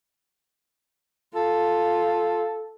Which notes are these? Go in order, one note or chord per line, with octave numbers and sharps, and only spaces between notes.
F4 A4